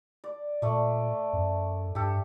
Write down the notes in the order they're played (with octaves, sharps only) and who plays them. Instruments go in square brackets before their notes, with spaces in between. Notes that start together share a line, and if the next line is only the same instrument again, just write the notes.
[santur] D5
[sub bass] A#2 [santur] A3 D5
[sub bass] F#2
[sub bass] G2 [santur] G4 A4